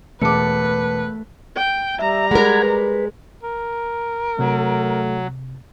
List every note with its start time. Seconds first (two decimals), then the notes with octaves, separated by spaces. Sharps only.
0.22 E1 A3 B4 A5 D6 C#7
1.57 G5
1.99 G3 E5 A#5
2.31 G#3 A#4 F#5 B5 G#6
2.63 B4
3.43 A#4
4.39 C3 F#3 A3